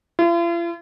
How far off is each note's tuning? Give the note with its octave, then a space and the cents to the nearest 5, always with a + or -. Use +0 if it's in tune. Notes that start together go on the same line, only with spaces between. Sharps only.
F4 -45